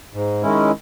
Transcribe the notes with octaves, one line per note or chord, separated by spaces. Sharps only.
G#2
D#3 G#3 C#4 E4